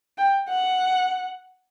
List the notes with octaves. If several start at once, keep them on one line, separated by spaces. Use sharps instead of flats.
G5
F#5